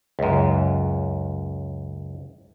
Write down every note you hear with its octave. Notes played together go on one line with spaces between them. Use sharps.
C#2 F#2